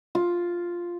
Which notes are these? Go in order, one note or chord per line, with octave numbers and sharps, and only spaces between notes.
F4